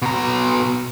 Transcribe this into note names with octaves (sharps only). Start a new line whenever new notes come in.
B2 A#5